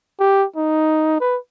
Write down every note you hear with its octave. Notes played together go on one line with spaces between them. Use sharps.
G4
D#4
B4